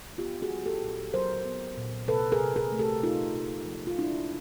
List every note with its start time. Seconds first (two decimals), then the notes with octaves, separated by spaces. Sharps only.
0.18 B3 F4 G4
0.42 F#4 G#4
0.50 F#3
0.66 G4 A4
0.81 A#2
1.14 F#3 A#4 C5
1.45 B3
1.77 A#2
2.08 C3 A4 B4
2.32 G#4 A#4
2.40 C3
2.56 G#4 A#4
2.72 A3
2.79 G4 A4
3.03 A3 D#4 F4
3.35 C3
3.66 F3
3.87 F4
3.98 G#3 D4 E4